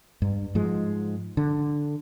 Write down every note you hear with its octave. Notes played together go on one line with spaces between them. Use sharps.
G2
G#2 F3 G#3
D3